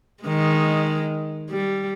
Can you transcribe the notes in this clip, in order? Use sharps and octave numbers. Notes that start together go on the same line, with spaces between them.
D#3 G#3
G3